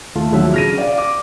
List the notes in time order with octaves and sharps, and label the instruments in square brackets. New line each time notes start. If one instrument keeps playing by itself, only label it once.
[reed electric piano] D#2 F4 [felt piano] A3
[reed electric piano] D#2 F#3 E5 [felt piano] D3 F3
[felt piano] C#3 A#6 D#7 [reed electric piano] F6
[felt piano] D5 F5
D6